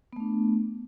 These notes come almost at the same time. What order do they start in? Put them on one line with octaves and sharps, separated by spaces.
B3 A3 D4